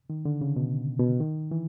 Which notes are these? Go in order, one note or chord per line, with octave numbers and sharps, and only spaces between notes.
D#3
D3
C#3
B2
B2
D#3
E3